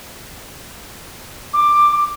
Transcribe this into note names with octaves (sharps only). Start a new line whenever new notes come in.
D6